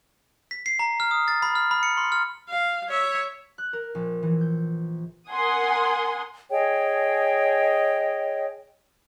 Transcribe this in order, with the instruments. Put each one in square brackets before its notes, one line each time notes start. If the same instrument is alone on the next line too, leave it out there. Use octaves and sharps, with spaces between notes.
[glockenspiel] B6
C7
A#5
F6
D#6
A6
B5
F6
B5
C#7
C6
F6
[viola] F5
C#5 E5
[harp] F#6
A#4
A#1
E3
G6
[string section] A#4 F#5 G#5 C6 D#6
[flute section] G#4 C#5 D#5 G5